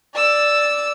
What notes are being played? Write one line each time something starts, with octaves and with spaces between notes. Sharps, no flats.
D5 E6